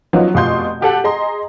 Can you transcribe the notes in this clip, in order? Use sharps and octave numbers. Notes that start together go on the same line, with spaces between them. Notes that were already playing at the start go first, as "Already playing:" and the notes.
F3 F#3 B3 C#4 D#4 F4
F1 B2 F4 C6 G6
F#4 G4 A4 F#5
G#4 D#5 A#5 C6